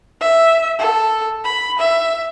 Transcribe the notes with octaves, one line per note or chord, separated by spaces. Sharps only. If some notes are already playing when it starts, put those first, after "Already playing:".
E5
A4
B5
E5